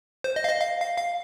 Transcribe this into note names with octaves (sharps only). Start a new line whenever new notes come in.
C5
D#5
F5
D#5
F5
F5
F5